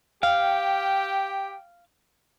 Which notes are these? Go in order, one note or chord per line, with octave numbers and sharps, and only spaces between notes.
G4 F5 G5